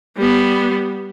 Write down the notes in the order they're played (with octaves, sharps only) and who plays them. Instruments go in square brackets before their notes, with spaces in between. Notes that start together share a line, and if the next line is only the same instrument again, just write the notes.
[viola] G3 B3